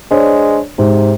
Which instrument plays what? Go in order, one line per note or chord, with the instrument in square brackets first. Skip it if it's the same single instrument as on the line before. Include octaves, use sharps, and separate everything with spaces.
[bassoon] G#3 [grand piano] D4 C5 C#5
[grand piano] G#2 [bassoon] C3